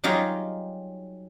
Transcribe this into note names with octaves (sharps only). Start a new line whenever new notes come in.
F#3 G3 D#4 F4 G4 G#4